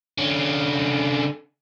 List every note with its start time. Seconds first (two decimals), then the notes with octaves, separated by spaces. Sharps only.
0.18 D3 C#4